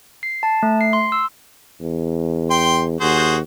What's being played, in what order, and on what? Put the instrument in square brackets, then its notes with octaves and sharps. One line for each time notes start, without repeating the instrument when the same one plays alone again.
[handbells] C7
A5
A3
C7
C6
E6
[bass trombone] E2
[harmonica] G5 C6
[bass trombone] D#2 [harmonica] F#4 G#4 C5